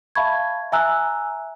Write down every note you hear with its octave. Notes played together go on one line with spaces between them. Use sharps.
E5 F5 A5 B5 C#6 G#6
E5 G#5 A#5 E6 F#6